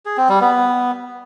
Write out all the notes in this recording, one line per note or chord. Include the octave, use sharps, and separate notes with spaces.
G#4
C4
G3
B3